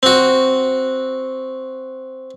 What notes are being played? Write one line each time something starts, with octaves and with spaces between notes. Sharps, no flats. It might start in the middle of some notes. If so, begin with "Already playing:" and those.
C4 F#4